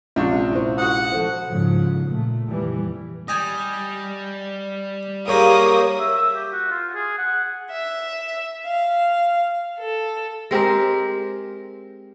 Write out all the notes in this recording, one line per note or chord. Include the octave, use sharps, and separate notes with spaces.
A#1 C3 G#3 C#4 D4 E5 C#6
E4 C5
F#4 F#5 D#6
F3 A4 C5
G#2 C#3 F3
A#2 A3
F2 E3 G3
G3 D#5 G5 G#5
G#2 F#3 A#3 G4 A#4 C#5 C#6 D#6
E5
E6
G4
F#4
F4
G#4
F#5
E5
F5
A4
G#3 C4 G4 A#4